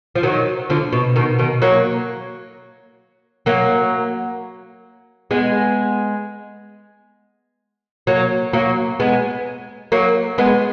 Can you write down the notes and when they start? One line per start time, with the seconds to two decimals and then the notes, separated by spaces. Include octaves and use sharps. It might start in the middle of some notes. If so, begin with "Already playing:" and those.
0.16 F3
0.23 D#3 F#3
0.70 D3 F3
0.93 B2
1.16 B2 D#3
1.39 B2 D#3
1.62 F#3 A#3
3.46 F#3 A#3
5.31 G#3 B3
8.07 F#3 A#3
8.53 F#3 A#3
9.00 G#3 B3
9.92 F#3 A#3
10.38 G#3 B3